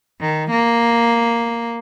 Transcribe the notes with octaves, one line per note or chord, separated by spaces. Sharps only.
D#3
A#3